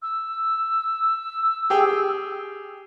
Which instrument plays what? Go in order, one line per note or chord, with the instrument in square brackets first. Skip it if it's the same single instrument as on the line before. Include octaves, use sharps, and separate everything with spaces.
[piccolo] E6
[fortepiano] G4 G#4 G5